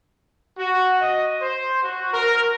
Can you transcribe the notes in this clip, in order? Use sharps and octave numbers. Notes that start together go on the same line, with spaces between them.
F#4
D#5
C5
F#4
A#4